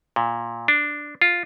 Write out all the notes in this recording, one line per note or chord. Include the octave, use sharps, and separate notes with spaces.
A#2
D4
F4